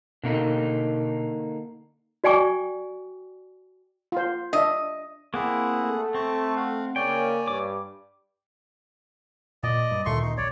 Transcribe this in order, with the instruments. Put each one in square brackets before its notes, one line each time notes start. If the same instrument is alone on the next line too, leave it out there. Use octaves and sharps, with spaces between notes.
[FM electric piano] B2 [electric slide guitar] D3 A#3 D#4
[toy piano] F#4 D5 G5 G#5 C#6 D6
[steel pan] F4 C5
[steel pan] D4 E5 [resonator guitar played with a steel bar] D#5
[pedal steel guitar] A#3 C4 E4 [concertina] G#4 F#5
[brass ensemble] A3
[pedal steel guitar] C4 [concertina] A5 C#6
[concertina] F5 F#5
[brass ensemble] C#3 A#3 [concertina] C#5 D5 G#5 [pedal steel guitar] G5
[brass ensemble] G2 [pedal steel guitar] D6
[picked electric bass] A#2 [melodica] D5 D#5
[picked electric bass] G2
[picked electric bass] D2 A#2 D#3 [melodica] A3 C6 C#6
[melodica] D#4
[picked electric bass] A#1 [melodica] C#5 D5